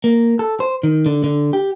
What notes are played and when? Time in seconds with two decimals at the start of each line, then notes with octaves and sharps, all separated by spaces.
0.04 A#3
0.39 A4
0.60 C5
0.83 D#3
1.06 D3
1.24 D3
1.53 G4